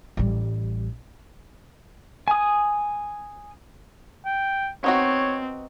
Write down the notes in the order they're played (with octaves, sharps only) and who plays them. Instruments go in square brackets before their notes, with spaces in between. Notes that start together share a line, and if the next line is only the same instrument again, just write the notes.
[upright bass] A1 G3
[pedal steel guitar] G#5 D#6
[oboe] G5
[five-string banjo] B3 D#4 F#4 [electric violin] C4 [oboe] C#5